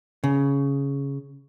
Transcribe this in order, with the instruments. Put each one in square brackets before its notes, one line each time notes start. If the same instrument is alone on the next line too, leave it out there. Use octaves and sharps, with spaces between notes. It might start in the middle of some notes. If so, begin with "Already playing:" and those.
[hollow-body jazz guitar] C#3